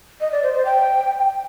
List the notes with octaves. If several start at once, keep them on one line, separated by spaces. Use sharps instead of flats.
D#5
D5
C5
C5
G5